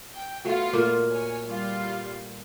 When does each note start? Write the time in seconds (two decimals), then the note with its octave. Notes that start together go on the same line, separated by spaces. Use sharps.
0.14 G5
0.45 F#3 A3 B3 F4 F5
0.73 A#2 A3 A#3
1.10 C#5 G#5
1.45 G3 F4